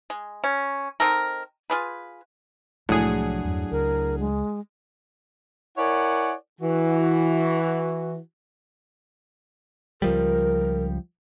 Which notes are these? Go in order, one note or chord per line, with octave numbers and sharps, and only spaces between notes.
G#3
C#4
C4 D#4 A4 A#4
F4 G#4 B4
C2 A2 F3 F#3 G#3 D4 G#4 F#5
E2 G2
C#2 A#4
G#3
E4 A#4 C#5 D5 F#5 G#5
E3 F#4
C#2 F3 G3 A#4